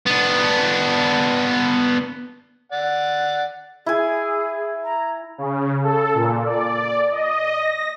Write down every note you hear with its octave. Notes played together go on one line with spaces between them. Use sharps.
B3 D4
D5 F#5
E4 G#4 G#5
A#5
C#3
A4
A#2
D5
D#5
A#6